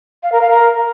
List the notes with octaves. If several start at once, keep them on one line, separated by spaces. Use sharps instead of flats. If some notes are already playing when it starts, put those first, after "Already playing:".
F5
A#4
F5
A#4